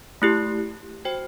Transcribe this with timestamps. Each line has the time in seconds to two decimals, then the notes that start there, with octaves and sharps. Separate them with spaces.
0.22 A3 E4 G4
1.05 F#4 C5 G5